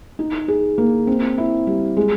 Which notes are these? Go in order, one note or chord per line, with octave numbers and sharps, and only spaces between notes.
D#4
G#4
A#3
C4
E4
G3
G#3